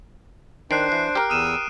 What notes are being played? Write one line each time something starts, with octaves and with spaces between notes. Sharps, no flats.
D#3 D4 C5 F#6 C7 D7
E3
G4 A#4 F6 D7
E2 D#6 E6 D#7 E7
D#7